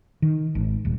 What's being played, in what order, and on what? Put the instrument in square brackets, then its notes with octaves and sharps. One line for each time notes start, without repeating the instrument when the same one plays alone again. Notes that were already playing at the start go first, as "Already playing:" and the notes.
[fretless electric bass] D#3
G#1
D#1